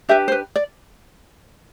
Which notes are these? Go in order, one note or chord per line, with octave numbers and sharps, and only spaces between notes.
D4 G4 B4 E5
C5
B4
D5